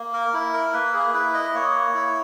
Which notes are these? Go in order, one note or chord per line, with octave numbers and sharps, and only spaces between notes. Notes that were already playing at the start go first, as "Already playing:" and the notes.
Already playing: A#3
A#4
E4
A#4
A#3 B4
G#4
E4 B4
D#5
A#3 C#5
E4